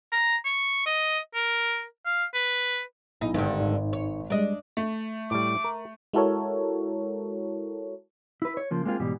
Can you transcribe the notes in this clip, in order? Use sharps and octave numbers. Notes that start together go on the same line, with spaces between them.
A#5
C#6
D#5
A#4
F5
B4
B1 D#4 E4
G#1 G2 D3
G#2 D#4
C#5
G3 G#3 D4 D#5
A3
A2 G3 D6
A#4
G#3 E4 F#4 A4 A#4 C#5
E4 B4
C#5
C#3 F3 A#3
G#3 A#3 C4 F4 G#4
G#2 B2 E3 G3